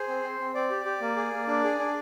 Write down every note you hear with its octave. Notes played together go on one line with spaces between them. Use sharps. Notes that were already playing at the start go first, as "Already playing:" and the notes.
Already playing: G#4 C5
C4
C4
C4
C4 D5
G4
G4
A#3
G#4
A#3
D4
G#4
D4